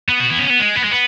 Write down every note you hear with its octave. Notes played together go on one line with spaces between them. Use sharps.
B3
F#4
E4
C#4
B3
G#3
B3
G#3
B3